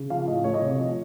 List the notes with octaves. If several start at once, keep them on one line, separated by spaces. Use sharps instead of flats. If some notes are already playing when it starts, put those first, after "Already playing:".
Already playing: C#3
F3 F5
A2 D#5
A3 C#5
D#5
C3 C#5
F3